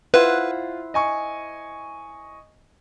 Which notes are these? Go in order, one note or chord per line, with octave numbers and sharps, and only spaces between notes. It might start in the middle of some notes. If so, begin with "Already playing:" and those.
E4 F4 B4 C5 F#5
D#5 G#5 C#6